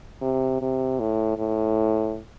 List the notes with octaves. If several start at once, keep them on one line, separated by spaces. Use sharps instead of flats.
C3
C3
A2
A2